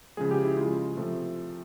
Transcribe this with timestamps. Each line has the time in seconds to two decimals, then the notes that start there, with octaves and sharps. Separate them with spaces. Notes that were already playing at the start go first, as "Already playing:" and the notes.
0.17 C#3 F3 G#3 G#4
0.31 G4
0.44 E4
0.57 C#3 F3 G#3 F4
0.97 C3 F3 A3